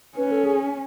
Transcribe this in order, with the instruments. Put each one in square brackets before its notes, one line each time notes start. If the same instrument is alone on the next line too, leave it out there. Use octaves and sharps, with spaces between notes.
[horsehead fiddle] C#4 [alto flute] B4
[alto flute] A4
G#4